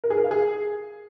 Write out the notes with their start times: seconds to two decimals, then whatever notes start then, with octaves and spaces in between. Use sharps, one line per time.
0.04 A#4
0.10 G#4
0.17 A#4
0.24 F5
0.31 G#4